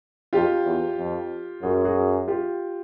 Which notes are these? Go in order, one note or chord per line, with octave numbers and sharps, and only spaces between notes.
F2 F4 G4
E2
F2
F#2 F#4 G#4
F#4 G#4
F4 G4